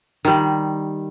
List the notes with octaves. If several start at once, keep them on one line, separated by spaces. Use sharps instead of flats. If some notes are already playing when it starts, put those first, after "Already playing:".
D#3 G3